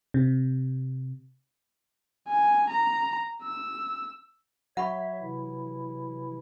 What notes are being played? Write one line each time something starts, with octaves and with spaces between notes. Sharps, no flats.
C3
G#5
A#5
E6
F#3 C#5 E5 F#5 B5 C#6
C3 E3 E4